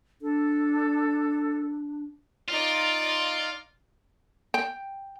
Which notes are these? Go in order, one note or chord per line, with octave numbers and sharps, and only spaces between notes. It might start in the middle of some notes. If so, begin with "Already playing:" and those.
D4 A4
D#4 F4 D5
G5